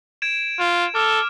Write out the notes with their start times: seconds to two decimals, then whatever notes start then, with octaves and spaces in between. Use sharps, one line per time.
0.22 G#6 D7 E7
0.60 F4
0.95 A4 D6 F6